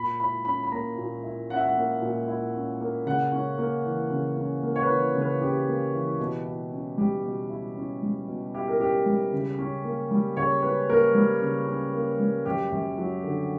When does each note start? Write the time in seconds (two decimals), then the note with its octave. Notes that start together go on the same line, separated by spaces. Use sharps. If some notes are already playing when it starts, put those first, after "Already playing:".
Already playing: A#2 B5
0.20 E4 B5
0.45 C#4 B5
0.63 B5
0.72 A#3 A#5
0.98 A#2
1.23 E4
1.50 C#4 F#5
1.56 E5
1.64 F#5
1.77 A#3
2.02 A#2
2.28 E4
2.54 C#4
2.80 A#3
3.06 C#3 F#5
3.32 C#4
3.58 A#3
3.85 E3
4.10 C#3
4.37 C#4
4.63 A#3
4.76 C#5
4.83 B4
4.89 E3
5.15 C#3
5.22 B4
5.41 C#4 G4
5.68 A#3
5.93 E3
6.19 B2
6.45 E4
6.72 C#4
6.98 G3 G4
7.23 B2
7.50 E4
7.76 C#4
8.02 G3
8.28 B2
8.55 E4 G4
8.68 A#4
8.80 C#4 G4
9.06 G3
9.33 C#3
9.59 C#4
9.84 A#3
10.11 G3
10.37 C#3 C#5
10.62 C#4 B4
10.88 A#3 A#4
11.15 G3
11.41 C#3
11.67 C#4
11.94 A#3
12.19 G3
12.46 F#2 G4
12.72 F#2
12.98 F#3
13.24 D3